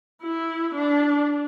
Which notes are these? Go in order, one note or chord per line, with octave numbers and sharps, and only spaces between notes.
E4
D4